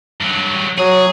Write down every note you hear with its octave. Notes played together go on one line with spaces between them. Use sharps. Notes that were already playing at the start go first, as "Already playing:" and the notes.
G2 F#3
F#3 G#4